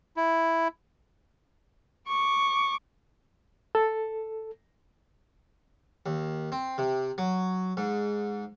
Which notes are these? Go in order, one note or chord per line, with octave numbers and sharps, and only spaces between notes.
E4
C#6 D6
A4
D#2
C4
C3
F#3
G#2